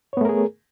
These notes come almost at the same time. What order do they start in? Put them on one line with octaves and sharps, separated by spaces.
C#5 B3 A3 A#4 G#4